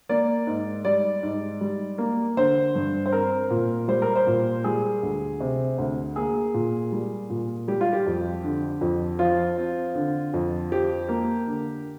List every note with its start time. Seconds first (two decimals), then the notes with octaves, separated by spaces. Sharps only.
0.09 A#3 D5
0.47 G#2
0.85 G3 D5
1.23 G#2
1.61 G3
1.98 A#3
2.37 D3 C5
2.75 G2
3.06 C5
3.12 C4 A#4
3.50 A#2
3.88 G3 C5
4.02 A#4
4.16 C5
4.27 A#2
4.64 G3 G#4
5.02 D2
5.40 C3
5.78 D2
6.16 A#3 G#4
6.54 A#2
6.92 G3
7.30 A#2
7.68 G3 G4
7.81 F4
7.93 G4
8.06 F2
8.44 D3
8.81 F2
9.19 F3 F4
9.57 C4
9.95 D3
10.34 F2
10.71 F3 G4
11.09 A#3
11.47 D3